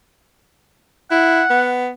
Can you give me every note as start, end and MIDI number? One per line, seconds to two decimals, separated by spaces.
1.11 1.43 64
1.11 1.68 78
1.50 1.90 59